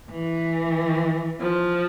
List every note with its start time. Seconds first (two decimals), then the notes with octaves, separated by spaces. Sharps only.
0.11 E3
1.40 F3